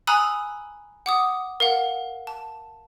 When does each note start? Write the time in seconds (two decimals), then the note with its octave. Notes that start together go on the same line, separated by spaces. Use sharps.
0.07 G#5 A#5 B5 D#6 E6 F#6
1.06 F#5 D6 D#6
1.60 A#4 F5 F#5
2.27 A5